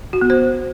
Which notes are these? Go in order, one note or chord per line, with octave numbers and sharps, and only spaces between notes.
F#4
B3
C5